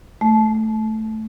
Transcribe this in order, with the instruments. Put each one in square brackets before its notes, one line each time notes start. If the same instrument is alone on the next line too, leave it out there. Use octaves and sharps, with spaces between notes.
[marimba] A3